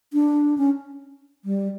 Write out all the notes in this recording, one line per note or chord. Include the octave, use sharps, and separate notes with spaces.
D4
C#4
G3